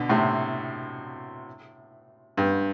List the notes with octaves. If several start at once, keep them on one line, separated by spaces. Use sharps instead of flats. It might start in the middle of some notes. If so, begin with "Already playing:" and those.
Already playing: B2 D3
A2 C3
G2